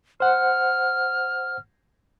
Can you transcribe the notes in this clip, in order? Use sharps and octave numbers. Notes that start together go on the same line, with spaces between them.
C5 F#5 F6